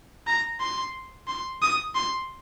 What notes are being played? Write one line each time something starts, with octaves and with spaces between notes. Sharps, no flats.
A#5
C6
C6
D#6
C6